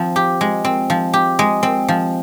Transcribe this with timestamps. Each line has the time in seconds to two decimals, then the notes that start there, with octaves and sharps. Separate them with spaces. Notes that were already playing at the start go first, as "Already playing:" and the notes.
Already playing: F3 C4
0.16 G4
0.41 G#3
0.65 C4
0.90 F3
1.13 G4
1.39 G#3
1.63 C4
1.88 F3